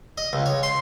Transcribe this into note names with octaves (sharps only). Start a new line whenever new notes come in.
D#5
C#2
C#5
C6